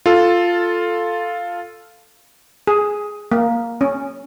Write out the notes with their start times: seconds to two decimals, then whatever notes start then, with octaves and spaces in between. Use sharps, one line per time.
0.06 F4 A4
2.67 G#4
3.32 A#3
3.81 C#4